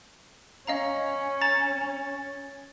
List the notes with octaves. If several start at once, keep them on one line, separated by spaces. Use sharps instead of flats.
C#4 D#5 F5 A#5
A#5 A6 E7